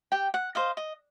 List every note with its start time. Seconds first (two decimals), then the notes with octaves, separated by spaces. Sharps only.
0.12 G4 G5
0.34 F#5
0.55 C5 D#5 F5
0.77 D#5